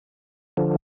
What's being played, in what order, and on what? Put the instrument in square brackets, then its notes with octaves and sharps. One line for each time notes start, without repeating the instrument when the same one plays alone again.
[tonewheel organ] D3 F3